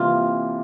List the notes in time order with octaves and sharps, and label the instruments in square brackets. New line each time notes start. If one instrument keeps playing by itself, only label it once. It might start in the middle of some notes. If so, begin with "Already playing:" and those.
Already playing: [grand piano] C3 E3 G3 A#3 [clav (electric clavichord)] F4